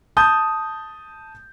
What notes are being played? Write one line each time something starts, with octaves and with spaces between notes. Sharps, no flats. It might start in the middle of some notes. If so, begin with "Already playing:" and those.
A5 D#6 G6